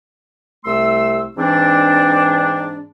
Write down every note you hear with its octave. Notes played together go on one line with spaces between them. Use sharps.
C2 A3 C6 E6
G#2 E3 C4 D4